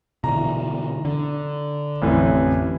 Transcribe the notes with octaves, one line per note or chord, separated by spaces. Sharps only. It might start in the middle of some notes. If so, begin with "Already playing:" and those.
B2 D3 E3 A#5
D3
A1 F2 E3